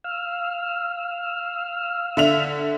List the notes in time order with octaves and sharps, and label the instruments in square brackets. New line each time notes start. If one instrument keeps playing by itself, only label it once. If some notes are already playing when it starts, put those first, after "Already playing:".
[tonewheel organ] F5 E6 F6
[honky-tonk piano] D3 E5 F7